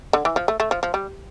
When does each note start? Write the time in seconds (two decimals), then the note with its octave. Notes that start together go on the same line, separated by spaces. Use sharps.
0.13 D3
0.25 E3
0.36 F3
0.48 A3
0.60 A3
0.71 F3
0.83 F3
0.94 G3